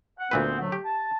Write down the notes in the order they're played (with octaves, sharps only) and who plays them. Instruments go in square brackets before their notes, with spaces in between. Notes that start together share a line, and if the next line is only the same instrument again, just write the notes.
[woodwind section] F#5
[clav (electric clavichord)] D2 A#2 B4 [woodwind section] B3 C4
[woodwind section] D3 F#3 A3
[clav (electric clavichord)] G4
[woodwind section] A5